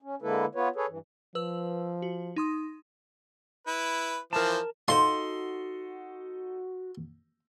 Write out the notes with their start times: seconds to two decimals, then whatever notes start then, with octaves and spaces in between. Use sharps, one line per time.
0.02 C#4
0.22 D3 G#3 A#3 E4 A4 B4
0.55 B3 F4 B4 C#5
0.76 G#4 A4 B4 C#5
0.89 G2 E3
1.35 F3 B4 E6
2.02 F#4
2.36 D#4 C6 D#6
3.67 E4 B4
4.33 E3 F3 A#4 C5 A5
4.88 D#4 F4 F#4 A4 C5 D#5 C6